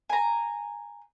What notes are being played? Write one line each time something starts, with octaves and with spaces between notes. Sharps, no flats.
G#5 A#5